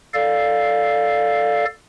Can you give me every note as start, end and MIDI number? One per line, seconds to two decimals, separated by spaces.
0.14 1.65 69
0.14 1.65 74
0.14 1.65 77